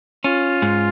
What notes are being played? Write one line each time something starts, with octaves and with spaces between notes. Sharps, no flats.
C#4 F4
G#2